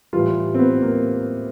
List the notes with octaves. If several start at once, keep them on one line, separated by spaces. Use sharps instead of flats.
A2 E3 G3 F4
C4
B3
A#3